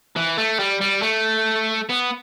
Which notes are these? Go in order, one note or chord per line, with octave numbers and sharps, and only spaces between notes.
E3
A3
G3
G3
A3
B3